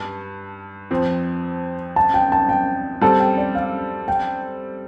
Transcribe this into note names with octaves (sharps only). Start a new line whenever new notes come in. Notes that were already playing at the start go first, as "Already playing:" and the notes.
Already playing: G2 A5
F2 F3 C4
A5
G5
A5
G5
G3 C4 A4 A5
G5
D5
F5
G5